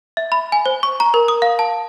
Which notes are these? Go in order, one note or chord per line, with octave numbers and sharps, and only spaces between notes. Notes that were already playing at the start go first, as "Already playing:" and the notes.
E5
B5
G#5
C5
C#6
A#5
A#4
D#6
F5
A5